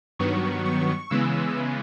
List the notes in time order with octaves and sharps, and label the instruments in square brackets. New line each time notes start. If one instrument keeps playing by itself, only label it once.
[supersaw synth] G2 D#3 F#3 B3 C#6
C#6
C#3 E3 G#3 B3 E6